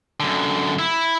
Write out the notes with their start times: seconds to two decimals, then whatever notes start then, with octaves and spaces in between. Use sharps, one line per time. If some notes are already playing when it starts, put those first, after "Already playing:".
0.20 F#2 D3
0.79 E4